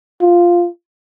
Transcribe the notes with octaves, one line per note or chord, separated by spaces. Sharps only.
F4